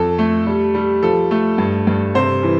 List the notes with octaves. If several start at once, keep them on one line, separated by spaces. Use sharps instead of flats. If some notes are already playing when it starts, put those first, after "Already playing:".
Already playing: F2 A4
A3
G3
G3
F3 A4
A3
G2
G2
C3 C5
E3